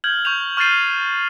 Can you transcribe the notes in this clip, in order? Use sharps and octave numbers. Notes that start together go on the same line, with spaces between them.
F6 G6 G#6 F#7
C#6 G6 F7
C#6 F6 G6 A6 C7 D#7